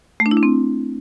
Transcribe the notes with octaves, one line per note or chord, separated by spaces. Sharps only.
A3
D4
E4
D4
C4